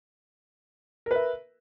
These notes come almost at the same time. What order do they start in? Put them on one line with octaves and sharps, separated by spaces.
A#4 B4 E5